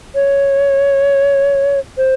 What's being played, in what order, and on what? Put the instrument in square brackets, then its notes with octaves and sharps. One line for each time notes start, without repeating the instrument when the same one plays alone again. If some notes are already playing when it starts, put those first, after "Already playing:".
[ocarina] C#5
C5